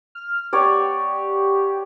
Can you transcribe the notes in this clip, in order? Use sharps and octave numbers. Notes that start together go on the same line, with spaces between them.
F6
B3 G4 C#5 D5